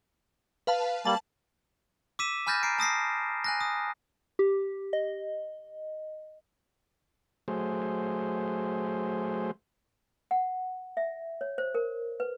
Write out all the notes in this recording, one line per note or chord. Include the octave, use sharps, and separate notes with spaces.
B4 F5 A5
G3 A#3 A5 F#7
D6 E6 B6 D#7 E7
G#5 B5 F6 G6 A6 A#6
A#5 C7 D7
A5 D#6 A#6 C7
G#5 F#6 A#6
D#6
G4
D#5
F#3 A3 G#4 C5
F#5
E5
C#5
C5
A#4
B4